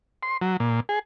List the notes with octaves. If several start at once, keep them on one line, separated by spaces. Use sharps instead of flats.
C6
F#3
A#2
G#4